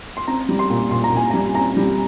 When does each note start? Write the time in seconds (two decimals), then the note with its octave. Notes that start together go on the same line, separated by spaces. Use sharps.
0.17 C6
0.27 C4 A#5
0.49 G3
0.59 C6
0.70 A#2
0.90 A#2 C6
1.04 A#5
1.12 A#2 G#5
1.30 A#5
1.34 G3
1.55 C4 A#5
1.77 G3